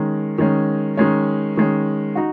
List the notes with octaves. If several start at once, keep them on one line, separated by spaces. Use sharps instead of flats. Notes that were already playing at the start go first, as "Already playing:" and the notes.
Already playing: D#3 G#3 C#4
D#3 G#3 C#4
D#3 G#3 C#4
D#3 G#3 C#4
D#4 F#4